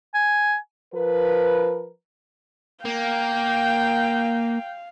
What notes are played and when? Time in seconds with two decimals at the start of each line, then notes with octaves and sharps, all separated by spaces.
0.14 G#5
0.94 F3 A#4 B4
2.85 A#3 F5 G5